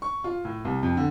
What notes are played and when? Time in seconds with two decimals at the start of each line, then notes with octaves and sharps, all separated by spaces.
0.02 C#6
0.24 F4
0.45 A2
0.65 C2
0.83 F2
0.97 D3